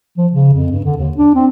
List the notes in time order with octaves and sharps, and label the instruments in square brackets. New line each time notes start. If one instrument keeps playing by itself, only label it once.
[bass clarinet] F3
C#3
F2
G2
D3
D#2
D4
C4